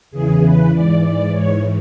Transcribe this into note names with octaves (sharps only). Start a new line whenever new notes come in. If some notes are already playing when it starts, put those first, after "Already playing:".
E2 C#3 E3 G#4
B4
G#2 E3 D5
D5
G#2 E3 C#5